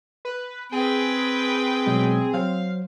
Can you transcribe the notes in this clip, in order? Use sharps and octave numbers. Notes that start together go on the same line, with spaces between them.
B4
C4 G#4 B4 G5
B2 F#3 G#3
F#3 C5 F5